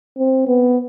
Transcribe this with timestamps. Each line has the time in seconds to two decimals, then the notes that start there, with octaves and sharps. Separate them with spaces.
0.18 C4
0.47 B3